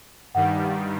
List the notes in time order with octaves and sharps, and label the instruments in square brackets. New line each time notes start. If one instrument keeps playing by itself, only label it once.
[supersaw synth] G2 D#3 G3 [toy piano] F#5
[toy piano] F5